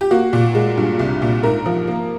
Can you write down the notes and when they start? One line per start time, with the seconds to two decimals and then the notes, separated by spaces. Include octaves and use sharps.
0.01 G4
0.11 A#3 F#4
0.33 A#2
0.55 G#3
0.77 G2
0.99 C2
1.22 A#2
1.43 G#2 A#4
1.66 F3
1.88 A#3